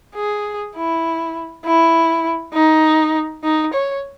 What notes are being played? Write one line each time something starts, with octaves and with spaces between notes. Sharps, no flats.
G#4
E4
E4
D#4
D#4
C#5